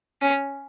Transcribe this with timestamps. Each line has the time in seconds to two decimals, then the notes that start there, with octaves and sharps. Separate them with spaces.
0.22 C#4